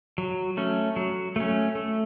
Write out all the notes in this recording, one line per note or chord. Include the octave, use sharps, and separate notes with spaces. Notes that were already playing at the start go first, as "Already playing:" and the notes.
F#3
A3 C#4
F#3
A3 C#4
A3